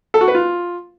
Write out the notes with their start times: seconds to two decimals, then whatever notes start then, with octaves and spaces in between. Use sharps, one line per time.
0.14 A4
0.21 F#4
0.28 B4
0.35 F4